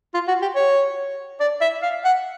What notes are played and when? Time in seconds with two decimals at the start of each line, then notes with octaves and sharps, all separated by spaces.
0.14 F4
0.28 F#4
0.42 G4
0.55 C#5
1.40 D5
1.61 E5
1.82 F5
2.04 F#5